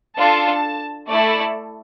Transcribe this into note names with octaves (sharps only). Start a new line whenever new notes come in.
D4 F4 A4 A5
A3 E4 A4 D5